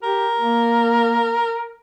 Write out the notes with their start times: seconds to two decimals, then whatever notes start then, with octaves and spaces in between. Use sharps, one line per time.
0.03 G4 A#4
0.39 A#3